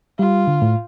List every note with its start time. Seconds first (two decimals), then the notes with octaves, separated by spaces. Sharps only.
0.19 G3 F4
0.47 D3
0.62 A2